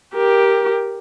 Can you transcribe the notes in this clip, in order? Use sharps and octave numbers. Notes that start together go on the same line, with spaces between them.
G4 A#4